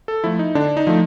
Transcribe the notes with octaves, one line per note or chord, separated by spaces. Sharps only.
A4
F3 A3 E4
D#4
D3 D4
D#4
F3 A3